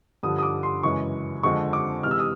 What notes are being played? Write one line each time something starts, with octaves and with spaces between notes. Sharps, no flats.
G2 D3 F3 D#6
D#6
D6
C6
F#2 C#3 E3 G#3 C#6
F2 D3 F3 G#3 C4 C#6
D6
C3 E3 G#3 F6
E6
D#6